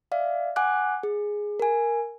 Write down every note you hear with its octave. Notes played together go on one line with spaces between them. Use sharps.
D5 E5 F5
F#5 G#5 D6 F#6
G#4
A#4 G#5